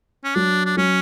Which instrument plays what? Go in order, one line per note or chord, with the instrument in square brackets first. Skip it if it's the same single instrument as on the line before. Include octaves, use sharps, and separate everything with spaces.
[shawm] C#4
[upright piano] F#3 [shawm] D4
[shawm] D4
[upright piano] F#3 [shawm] C#4